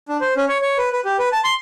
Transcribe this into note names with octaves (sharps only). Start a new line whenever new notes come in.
D4
C5
C#4
C#5
C#5
B4
B4
G4
B4
A5
C6